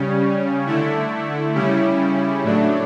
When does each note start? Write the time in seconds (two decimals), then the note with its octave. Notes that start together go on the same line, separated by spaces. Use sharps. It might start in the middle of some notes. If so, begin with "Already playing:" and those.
Already playing: C#3 G3 C#4
0.66 D3 A3 E4
1.54 C#3 G3 C#4 E4
2.44 A2 F#3 A3 D4